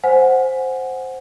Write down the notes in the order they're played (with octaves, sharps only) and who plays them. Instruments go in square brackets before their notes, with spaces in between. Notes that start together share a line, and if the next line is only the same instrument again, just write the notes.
[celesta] C5 F#5 G#5